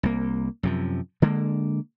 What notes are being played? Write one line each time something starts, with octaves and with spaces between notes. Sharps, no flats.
C2 A#3
F#2 C3 F3
D3 G#3 A#3